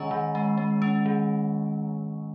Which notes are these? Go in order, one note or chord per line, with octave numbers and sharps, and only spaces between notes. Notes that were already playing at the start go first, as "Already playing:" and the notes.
Already playing: D#3 G#3 C#4 C#5 D#5 G#5 A#5 C#6
D#3
G#3
G#3
C#4
D#3